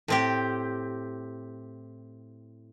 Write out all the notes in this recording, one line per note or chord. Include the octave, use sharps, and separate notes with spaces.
A2 C4 G4